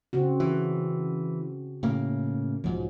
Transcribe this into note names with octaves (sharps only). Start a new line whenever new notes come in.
C#3 C4 F#4
E3
A2 C#3 A#3
B1 G#2 F3 F#3